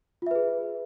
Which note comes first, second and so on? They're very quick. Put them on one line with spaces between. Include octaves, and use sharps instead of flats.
F4 E5 B4 G#4